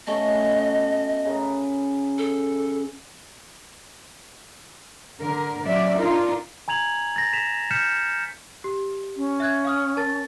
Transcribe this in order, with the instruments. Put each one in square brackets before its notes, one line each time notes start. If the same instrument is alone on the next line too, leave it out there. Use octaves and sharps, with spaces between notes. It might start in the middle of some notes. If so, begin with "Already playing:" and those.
[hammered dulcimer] B2 A3 C#4 [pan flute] D#5
[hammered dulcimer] C#3 A#4 B4
[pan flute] A4
[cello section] D3 A#4
F#3 C#4 D5 E5
D4 D#4 F4 A#4
[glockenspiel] G#5 A#5 G#6 F7 F#7
A6 A#6
B6 E7 F7
F6 G6 A#6 B6 C#7 E7
[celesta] G4
[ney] C#4
[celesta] E5 F#6 G#6
F5 D#6 F6
A#4 A5 A6